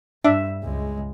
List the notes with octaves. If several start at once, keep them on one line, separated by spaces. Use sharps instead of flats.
G2 D4 E5
C#2 G#3